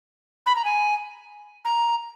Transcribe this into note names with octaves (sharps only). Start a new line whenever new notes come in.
B5
A#5
G#5
A#5